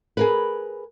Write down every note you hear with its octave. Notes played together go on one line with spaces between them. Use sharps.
G#4 A#4 B4